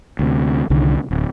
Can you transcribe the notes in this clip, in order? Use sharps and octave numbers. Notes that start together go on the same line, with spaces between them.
D2 C3
C2 D3 D#3
D1